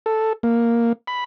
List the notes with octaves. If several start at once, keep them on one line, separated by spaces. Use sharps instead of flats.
A4
A#3
B5